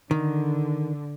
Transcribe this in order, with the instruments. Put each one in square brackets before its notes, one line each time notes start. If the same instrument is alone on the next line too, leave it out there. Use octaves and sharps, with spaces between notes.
[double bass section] D3 [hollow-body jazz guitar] D#3